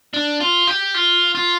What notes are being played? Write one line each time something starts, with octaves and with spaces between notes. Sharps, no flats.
D4
F4
G4
F4
F4